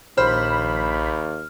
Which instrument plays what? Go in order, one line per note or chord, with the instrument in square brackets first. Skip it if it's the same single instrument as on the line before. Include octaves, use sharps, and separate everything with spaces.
[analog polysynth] A#1 B5 [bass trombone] D#2 [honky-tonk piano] C5 [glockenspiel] F6